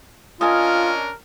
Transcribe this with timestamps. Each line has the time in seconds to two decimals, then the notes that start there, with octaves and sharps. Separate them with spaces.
0.41 C#4 D4 F4 A#4 D#5 G#5